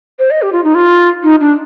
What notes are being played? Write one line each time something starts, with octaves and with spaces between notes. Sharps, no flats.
C5
D#5
G4
F4
D#4
F4
D#4
D4